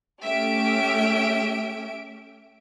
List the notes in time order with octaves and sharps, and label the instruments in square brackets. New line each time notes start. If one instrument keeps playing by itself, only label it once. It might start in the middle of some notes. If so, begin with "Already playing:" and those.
[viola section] A3 C#4 [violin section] G4 E5 D7